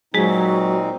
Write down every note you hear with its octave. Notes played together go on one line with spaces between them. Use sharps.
A#2 F#3 G#3 C4 D#4 G#4